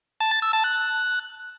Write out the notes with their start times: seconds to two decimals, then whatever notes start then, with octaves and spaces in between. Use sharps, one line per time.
0.20 A5
0.31 A6
0.42 E6
0.53 A5
0.64 F#6